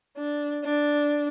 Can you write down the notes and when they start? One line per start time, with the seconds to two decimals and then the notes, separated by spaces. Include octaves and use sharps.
0.17 D4
0.65 D4